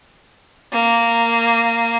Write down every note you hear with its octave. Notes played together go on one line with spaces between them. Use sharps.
A#3